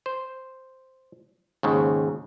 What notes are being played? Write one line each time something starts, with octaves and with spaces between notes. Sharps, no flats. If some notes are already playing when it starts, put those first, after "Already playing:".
C5
D#2 G#2 C#3